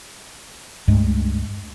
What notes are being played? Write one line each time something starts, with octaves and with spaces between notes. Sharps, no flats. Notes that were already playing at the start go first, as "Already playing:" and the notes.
C#2 G2 G#3 A3